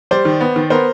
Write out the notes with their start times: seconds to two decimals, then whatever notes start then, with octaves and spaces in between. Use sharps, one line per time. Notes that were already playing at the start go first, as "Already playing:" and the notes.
0.11 G3 C5 D5
0.25 D#3
0.41 B3
0.56 D#3
0.70 B3 A#4 C5